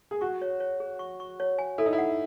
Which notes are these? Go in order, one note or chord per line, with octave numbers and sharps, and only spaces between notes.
G#4
F#4 C#6
C#5
C#5
G#4
C#6
C#6
C#5
G#5
E4 A4
D#4
E4
F#5